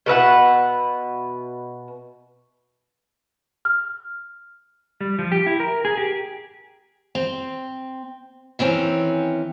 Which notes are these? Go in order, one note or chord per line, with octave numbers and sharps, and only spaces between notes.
B2 B4 E5 F#5
F6
G3
F3
G4
E4
A#4
G#4
G4
C4
D#3 E3 C4 C#4